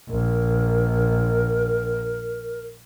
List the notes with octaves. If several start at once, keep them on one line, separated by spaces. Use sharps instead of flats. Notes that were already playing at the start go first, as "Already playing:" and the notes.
A#1 A#4